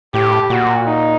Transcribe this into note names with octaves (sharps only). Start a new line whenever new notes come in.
A2 G4
A#2 F#4
D#4